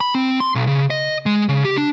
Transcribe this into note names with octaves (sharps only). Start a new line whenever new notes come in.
B5
C4
C6
B1
C#3
D#5
G#3
C#3
G4
D4